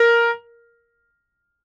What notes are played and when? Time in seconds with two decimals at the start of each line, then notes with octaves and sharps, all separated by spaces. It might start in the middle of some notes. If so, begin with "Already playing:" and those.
Already playing: A#4